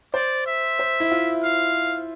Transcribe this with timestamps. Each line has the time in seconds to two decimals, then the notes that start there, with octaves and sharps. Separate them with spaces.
0.14 C5 D5
0.46 E5
0.79 C5
1.00 E4
1.12 F4
1.43 F5